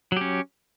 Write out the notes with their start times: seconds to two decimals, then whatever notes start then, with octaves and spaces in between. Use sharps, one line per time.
0.12 F#3
0.17 G4
0.21 C#4